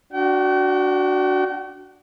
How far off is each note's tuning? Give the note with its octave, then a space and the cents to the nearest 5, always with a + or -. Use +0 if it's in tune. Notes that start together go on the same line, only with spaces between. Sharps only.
D4 -5 F#4 +0 G5 -40